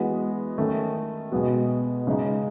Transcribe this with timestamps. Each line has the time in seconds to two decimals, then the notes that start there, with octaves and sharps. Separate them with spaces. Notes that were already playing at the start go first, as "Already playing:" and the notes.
Already playing: E3 G#3 B3 F#4
0.58 D#3 A3 C#4
1.31 B2 G#3 B3 F#4
2.07 C#3 G#3 D#4